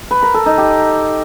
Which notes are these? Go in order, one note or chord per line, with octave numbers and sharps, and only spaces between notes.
B4
A#4
A4
D#4
G4